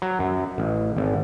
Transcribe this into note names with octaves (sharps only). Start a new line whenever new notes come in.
F#3
F#2
A1
G#1